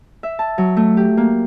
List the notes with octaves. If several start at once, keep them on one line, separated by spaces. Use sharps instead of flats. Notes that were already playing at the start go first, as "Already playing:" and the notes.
E5
A5
F#3
A3
G4
A#3